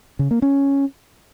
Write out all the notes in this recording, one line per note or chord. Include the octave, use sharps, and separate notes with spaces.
C#3
A#3
C#4